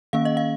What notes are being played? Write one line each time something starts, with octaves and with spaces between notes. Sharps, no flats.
D#3 A#3 C#4 F5
D#5
F5